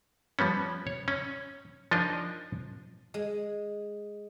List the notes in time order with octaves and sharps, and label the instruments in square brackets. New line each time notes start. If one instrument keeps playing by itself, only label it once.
[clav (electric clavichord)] F3 G3 B3 C#4
C#5
C#4
F3 D4 D#4 F4 A#4 D#5
[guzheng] G#3